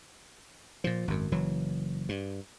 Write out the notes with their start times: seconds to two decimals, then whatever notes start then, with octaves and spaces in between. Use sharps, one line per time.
0.84 A#2 F3
1.08 G#1 F#2
1.32 F#1 E3 F#3
2.09 G2